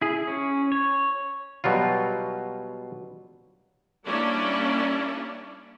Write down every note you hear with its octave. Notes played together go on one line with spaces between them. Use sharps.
E4 G#4
C#4
C#5
B2 F#3 G3 F4
G3 A#3 C#4 D4 E4 D5